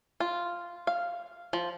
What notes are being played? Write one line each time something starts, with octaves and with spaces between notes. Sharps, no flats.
F4
F5
F3